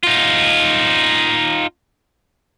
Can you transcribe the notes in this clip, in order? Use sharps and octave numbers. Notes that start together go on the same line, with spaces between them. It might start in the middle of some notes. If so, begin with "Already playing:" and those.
D#4 F4